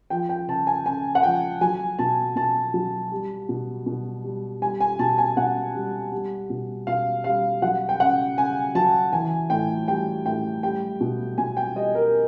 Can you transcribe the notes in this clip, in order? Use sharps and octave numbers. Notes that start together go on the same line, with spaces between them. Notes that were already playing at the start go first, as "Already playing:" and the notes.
F3 G5
G5
C#3 A5
G#5
C#3 G#5
F#5
F3 G5
F#3 G#5
B2 A5
B2 A5
F#3
G3
B2
B2
G3
G3 G#5
G#5
B2 A5
G#5
B2 F#5
G3
G3
B2
B2 F5
G3 F5
F#3 F#5
G5
C#3 F#5
C#3 G#5
F#3 A5
E3 G#5
A2 G5
G3 G5
A2 G5
G3 G5
B2
B2 G#5
G5
G3 D#5
A#4